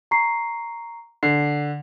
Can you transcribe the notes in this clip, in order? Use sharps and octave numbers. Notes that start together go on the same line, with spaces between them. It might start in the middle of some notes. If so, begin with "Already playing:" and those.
A#5 C#6 C7
D3 C7